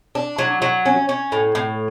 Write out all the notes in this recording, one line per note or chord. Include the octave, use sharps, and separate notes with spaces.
D4
F#3
F#3
C#4
C#4
A2
A2